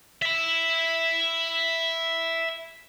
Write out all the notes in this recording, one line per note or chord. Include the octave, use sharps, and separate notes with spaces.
E5 B5